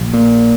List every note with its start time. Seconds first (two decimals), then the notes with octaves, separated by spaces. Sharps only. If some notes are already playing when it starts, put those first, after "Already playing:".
Already playing: A#1
0.14 A#2